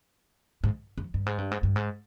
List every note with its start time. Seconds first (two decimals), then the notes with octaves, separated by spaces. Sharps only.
0.64 G#2
0.98 F2
1.14 G2
1.26 G#2
1.38 G2
1.51 G#2
1.63 G2
1.76 G#2